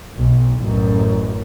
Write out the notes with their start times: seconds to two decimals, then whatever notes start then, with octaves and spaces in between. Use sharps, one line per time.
0.15 B1
0.59 A1 F#2